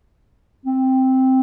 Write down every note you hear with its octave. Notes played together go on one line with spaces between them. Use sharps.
C4